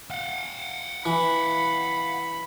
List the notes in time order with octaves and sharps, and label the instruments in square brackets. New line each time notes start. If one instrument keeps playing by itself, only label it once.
[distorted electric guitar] F5 F#5
[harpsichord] E3 [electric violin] B5